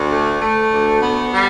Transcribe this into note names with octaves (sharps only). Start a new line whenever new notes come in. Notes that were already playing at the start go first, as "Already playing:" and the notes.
Already playing: D2
A3
A3
D2
B3
G3